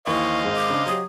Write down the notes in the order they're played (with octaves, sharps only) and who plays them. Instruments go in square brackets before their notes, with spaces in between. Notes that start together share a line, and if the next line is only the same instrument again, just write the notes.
[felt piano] D#2 E3 [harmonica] C5 D#5 F5 [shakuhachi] C#6
[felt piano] G#1 G#3
[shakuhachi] D6
[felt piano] C#3 D4
[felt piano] F#3 G4 [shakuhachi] D#6